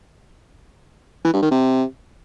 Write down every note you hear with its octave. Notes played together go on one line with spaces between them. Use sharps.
E3
G2
D#3
C3